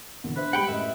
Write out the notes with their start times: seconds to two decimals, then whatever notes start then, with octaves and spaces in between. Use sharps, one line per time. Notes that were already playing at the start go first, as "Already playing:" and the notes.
0.24 E2 A#2 D3
0.36 D4 B4 C5 E5
0.53 G3 G#3 G4 F#5 G5 B5
0.68 F#2 A2 D#5 E5